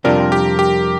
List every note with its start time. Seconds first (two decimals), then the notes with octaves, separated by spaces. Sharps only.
0.05 F2 C3 G3 D4 F4 A#4
0.32 G4
0.59 G4